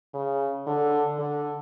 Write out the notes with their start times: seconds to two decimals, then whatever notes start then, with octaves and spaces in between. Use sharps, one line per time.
0.14 C#3
0.67 D3
1.19 D3